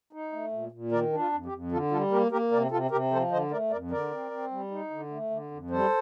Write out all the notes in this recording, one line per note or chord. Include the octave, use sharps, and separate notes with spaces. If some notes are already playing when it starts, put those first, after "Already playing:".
D#4
A3
A#2
A#2
D#3 A#4 D5
D4
F4
F2
G4
F2
D3 F4 A4
G3 F4 A4
A#3 G4 A#4
A#3 G4 A#4
C3 A#4 D5
C3 F4 A4
C3 G4 A#4
F3 A4 C5
D3 C5 D#5
A3 A#4 D5
F2 A#4 D5
D3 A#4 D5
C4
C4
G3
D#4
D3
A3
D3
F2
G3 A4 C5